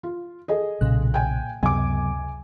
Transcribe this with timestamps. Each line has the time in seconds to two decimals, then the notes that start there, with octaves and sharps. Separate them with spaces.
0.03 F4
0.48 G#4 A4 D#5
0.81 B1 A#2 C#3 F#6
1.14 G5 G#5
1.63 C#2 F#2 C3 F#3 B3 G#5 D6